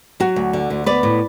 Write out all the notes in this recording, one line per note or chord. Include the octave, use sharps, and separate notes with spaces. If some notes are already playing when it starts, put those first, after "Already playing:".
F#3 F#4
D2
D3
D2
B3 B4 D5
A2